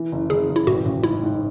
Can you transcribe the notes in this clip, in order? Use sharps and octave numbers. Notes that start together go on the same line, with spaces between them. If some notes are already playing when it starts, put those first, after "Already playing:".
Already playing: E3
F#1
F#1 G#4
F#1
E4
A1 F#4
A1
G#2 E4
G#2